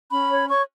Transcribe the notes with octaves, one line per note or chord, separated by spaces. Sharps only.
C#4 B5
C#5
C#5 C#6